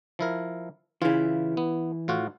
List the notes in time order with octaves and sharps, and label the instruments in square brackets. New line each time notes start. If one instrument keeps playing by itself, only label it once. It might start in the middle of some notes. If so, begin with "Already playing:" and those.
[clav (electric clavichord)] F3 E4 A#4
[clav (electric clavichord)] C#3 F4 [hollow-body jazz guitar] E3 E4
[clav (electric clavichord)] B3
A2 F4 F#4